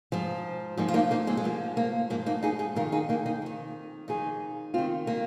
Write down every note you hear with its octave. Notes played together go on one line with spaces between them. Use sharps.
G#2 F3
G#2 F3 A#3 D#4
F4
A#3 D#4
A#3 D#4
G#3 C4
G#3
G#2 F3 A#3
A#3
G#2 F3 A#3
A#3 D#4
D#4 G#4
D#4 G#4
F2 D#3 F4 A#4
D#4 G#4
A#3 D#4
D#4 G#4
F2 D#3
F2 D#3 D#4 G#4
F2 D#3 C4 F4
A#3 D#4